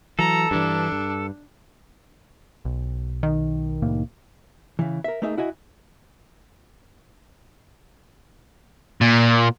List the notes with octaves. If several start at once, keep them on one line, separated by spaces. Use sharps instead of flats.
E3 F#3 A4 A#5
G2 E3 D4
G2
B1
D#3
C2 A2 A#3
C#3 E3
A#4 E5
A3 A#3 D#4 G#4 E5
E4 F#4 D#5 G#5
A#2